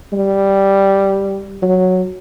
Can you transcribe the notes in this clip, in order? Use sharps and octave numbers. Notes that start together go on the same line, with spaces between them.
G3
F#3